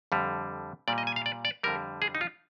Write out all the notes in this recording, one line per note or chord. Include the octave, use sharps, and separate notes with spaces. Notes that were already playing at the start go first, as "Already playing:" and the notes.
F2 D3 G3
A#2 G3 D5
D#5
G#5
F5
D5
D5
F2 D3 G3 A#4
G#4
D#4
F4